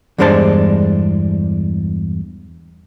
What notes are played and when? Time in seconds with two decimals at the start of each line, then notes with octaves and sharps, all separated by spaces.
0.18 E2 G2 G#3 D4 C5 A5